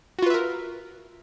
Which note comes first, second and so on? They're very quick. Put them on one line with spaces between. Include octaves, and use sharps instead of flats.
F#4 F4 B4 E5 A#4